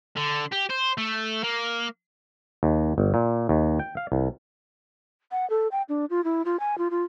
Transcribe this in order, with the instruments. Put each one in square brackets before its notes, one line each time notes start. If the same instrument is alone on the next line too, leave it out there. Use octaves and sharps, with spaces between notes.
[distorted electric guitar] D3
G4
C5
A3
A#3
[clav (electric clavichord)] D#2
G1
A#2
D#2
G5
F5
C2
[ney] F#5
A4
G5
D4
F4
E4
F4
G#5
F4
F4